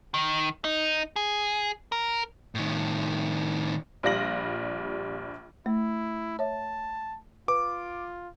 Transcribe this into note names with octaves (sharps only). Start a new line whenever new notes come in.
D#3
D#4
G#4
A#4
A2 D#3
A#1 G3 F4 A#6 F#7
A3 E4
C#5 E5 A5
F4 B4 D6